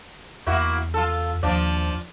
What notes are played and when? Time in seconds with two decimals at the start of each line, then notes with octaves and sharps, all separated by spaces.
0.47 E2 A#3 E4 F#4
0.94 F4 A4
1.43 D#2 F3 D4